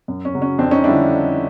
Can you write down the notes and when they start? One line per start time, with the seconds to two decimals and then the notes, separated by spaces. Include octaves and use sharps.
0.08 F#2
0.25 C#4
0.33 C#3 F#3
0.42 C#4
0.58 F2 C4 D4
0.71 C#4 D#4
0.84 D3 G3 D4 E4